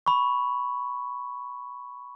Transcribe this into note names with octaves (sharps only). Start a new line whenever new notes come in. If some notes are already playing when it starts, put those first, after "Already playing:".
B5 C#6